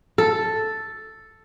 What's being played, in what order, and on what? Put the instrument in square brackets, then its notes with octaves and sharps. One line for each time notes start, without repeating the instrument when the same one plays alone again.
[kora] A4